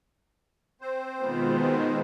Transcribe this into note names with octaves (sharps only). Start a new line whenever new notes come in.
C4 C5
B2 D#3 G#3 B3 F4